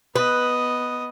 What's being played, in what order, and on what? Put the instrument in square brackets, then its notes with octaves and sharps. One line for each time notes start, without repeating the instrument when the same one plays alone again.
[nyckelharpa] B3 D#5 [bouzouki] B4